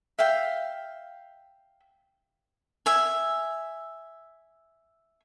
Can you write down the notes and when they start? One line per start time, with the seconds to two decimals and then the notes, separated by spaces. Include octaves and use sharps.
0.19 E5 F5 G5
2.86 E5 G#5